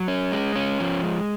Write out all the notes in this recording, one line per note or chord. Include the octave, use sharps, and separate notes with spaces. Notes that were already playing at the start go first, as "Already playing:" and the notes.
Already playing: F#3
C#4
G#3
C#4
F3
G#3